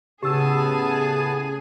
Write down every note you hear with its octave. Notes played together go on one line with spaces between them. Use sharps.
A2 C#3 B3 G4 G#4 G#5 A5 E6